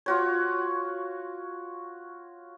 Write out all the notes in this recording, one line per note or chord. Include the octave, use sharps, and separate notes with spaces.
F4 F#4 C#5